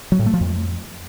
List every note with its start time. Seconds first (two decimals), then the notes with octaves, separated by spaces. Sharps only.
0.12 F#3
0.19 A2
0.26 A3
0.33 F3
0.41 F2